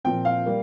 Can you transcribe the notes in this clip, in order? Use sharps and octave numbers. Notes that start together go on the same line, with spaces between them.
A#2 F3 C4 G5
F5
G3 A#3